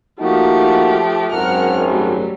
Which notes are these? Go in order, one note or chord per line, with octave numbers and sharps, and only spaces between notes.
F3 A3 A#3 D#4 F#4 G4
G#1 F#2 A#4 F#5 F6
F#3 G3 A3